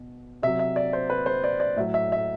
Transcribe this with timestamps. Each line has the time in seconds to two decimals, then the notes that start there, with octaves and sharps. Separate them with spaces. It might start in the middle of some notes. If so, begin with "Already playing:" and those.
Already playing: B2
0.43 C3 F#3 E5
0.59 E5
0.76 D5
0.93 C5
1.10 B4
1.26 C5
1.44 D5
1.60 D5
1.76 A2 F#3 E5
1.94 E5
2.12 E5